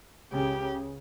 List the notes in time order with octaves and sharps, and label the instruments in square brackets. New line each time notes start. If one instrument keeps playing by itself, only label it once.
[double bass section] C#2 C#3 [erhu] G4